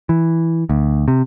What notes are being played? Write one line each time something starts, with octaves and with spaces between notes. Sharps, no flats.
E3
D2
C3